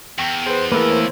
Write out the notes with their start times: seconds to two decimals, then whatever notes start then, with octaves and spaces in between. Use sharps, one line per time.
0.18 E2 G5 C#6 A#6
0.46 G#4 B4 C5
0.72 E3 A3 A#3 A#4 B4 B5
0.90 C5 C#5